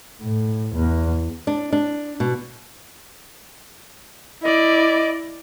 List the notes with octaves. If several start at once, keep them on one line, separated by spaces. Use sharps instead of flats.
A2
E2
D4
D4
B2
E4 D5 D#5